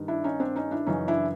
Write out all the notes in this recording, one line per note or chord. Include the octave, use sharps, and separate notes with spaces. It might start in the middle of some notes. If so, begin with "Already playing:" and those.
Already playing: G2 D#3
D4 E4
C#4 D#4
C4 D4
C#4 D#4
D4 E4
F#2 C#3 E3 C#4 D#4
D4 E4